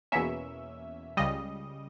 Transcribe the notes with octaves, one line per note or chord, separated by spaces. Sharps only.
E2 B2 A#3 C#4 E5
C#2 C#3 G3 D#5